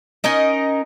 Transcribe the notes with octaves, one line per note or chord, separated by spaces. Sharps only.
C#4 D#4 A#4 D#5